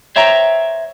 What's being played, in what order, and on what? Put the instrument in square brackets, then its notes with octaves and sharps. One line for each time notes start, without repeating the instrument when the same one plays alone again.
[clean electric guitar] C5 C#5 E5 G5 A#5